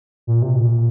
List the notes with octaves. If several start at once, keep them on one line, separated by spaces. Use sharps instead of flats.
A#2
C3
A#2